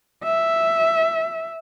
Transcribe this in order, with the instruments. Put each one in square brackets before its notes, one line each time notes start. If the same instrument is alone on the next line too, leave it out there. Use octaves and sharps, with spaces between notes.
[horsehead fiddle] E5